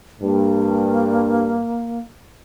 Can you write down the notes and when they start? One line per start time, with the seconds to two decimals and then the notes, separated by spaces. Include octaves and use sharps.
0.21 G2 A#3